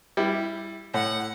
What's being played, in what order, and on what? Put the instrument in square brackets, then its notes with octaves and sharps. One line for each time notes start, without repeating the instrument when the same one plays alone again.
[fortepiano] G3 E4
[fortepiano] A2 [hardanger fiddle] F#5